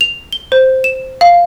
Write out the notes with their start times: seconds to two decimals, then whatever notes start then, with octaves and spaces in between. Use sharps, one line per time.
0.01 F7
0.33 G7
0.52 C5
0.84 E7
1.21 F5